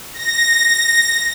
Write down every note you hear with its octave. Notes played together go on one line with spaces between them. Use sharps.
A#6